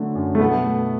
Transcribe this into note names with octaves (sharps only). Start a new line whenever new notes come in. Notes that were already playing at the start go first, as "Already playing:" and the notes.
Already playing: D3 F#3 A3
F#2
A3
B2 B3
A3